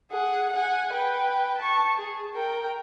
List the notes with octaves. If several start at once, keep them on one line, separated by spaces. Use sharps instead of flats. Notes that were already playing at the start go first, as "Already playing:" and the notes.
G#4 F#5
F#5 G#5
B4 G5
A5 C#6
G#4
A#4 G5